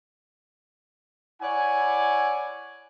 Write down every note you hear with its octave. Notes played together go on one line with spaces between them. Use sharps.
E4 C#5 D5 F#5 G#5